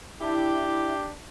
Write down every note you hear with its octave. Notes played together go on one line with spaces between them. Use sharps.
D4 E4 G4